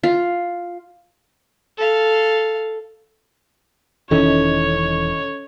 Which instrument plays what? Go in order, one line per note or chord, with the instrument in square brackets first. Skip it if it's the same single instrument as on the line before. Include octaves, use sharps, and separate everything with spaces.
[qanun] F4
[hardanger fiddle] A4 F5
[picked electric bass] E1 D#3 E3 [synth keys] C#4 A4 D#5 [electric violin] C#5